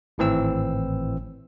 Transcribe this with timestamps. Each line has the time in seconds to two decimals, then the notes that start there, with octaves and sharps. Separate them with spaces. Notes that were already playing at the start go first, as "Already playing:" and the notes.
0.18 G#1 A2 E3 C4 E6